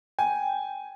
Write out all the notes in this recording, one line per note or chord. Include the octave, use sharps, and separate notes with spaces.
G5 G#5